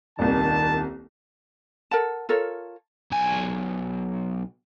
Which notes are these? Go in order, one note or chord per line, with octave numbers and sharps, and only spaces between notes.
D#1 C2 D#3 A5
A4 A#4 F#5 A5
F4 A4 A#4 C#5
B1 G#5